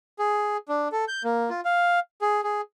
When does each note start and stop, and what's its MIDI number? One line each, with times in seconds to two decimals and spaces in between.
0.19 0.57 68
0.69 0.88 62
0.92 1.05 69
1.08 1.23 91
1.24 1.50 58
1.50 1.61 65
1.65 2.00 77
2.22 2.41 68
2.43 2.61 68